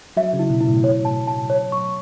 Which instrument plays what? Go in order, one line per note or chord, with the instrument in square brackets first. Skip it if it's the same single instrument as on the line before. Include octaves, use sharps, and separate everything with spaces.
[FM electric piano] F#3 [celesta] E5
[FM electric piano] C#3
[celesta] E4
[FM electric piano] B2
[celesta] E4
[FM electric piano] A2
[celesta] C#5
A5
A5
C#5
C#6